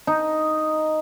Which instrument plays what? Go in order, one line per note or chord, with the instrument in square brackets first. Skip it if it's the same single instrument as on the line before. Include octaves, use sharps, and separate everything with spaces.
[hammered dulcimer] D#4